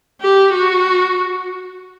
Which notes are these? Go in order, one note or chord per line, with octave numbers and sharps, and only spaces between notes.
G4
F#4